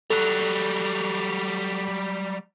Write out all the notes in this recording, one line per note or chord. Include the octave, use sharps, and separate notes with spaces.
F#3 G3 A4 F#6